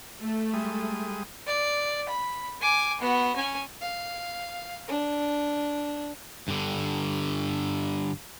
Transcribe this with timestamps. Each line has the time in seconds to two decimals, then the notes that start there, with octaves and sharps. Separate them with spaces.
0.19 A3
0.53 G3 G#3 D#6
1.47 D5
2.09 B5
2.61 G#5 D6
3.00 B3 F#4
3.36 C#4 G#5
3.81 F5
4.88 D4
6.48 G2 D3